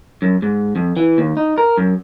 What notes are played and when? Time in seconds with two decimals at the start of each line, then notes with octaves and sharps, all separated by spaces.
0.22 F#2
0.42 G#2
0.76 F2
0.97 E3
1.18 D#2
1.37 D#4
1.58 A#4
1.77 F#2